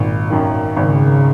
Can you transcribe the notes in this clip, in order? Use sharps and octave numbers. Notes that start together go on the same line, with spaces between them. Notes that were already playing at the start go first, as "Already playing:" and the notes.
Already playing: G#1 A#2
F#2 D#3
G#1 C#3